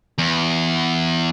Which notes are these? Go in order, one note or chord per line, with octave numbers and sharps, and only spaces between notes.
E2